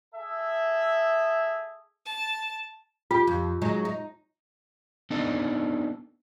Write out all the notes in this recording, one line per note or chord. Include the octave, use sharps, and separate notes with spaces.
G#4 A4 E5
A5
F4 G4
F2
F#3 G#3 D#4
D#4
B3 D4 D#4 A4 D5 D#5